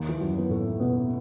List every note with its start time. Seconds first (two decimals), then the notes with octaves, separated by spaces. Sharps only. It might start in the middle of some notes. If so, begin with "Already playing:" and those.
Already playing: D#2 D#3
0.09 E3
0.20 F#2 F#3
0.38 B3
0.50 A2 A3
0.80 B2 B3